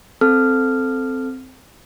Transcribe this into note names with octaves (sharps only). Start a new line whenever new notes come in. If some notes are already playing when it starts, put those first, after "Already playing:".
C4 A4 F6